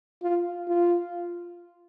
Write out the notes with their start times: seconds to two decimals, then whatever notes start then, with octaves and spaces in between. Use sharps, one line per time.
0.23 F4
0.68 F4